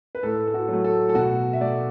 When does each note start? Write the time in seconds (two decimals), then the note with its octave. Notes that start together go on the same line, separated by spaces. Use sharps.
0.15 B4
0.23 A2 A4
0.48 A4
0.54 F#4
0.68 F#3 A3
0.84 A4
1.09 A4
1.14 B2 F#4
1.53 E5
1.61 A3 D5